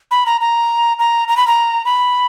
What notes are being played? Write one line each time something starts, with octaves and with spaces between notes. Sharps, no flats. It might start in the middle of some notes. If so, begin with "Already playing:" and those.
B5
A#5
A#5
A#5
A#5
B5
A#5
B5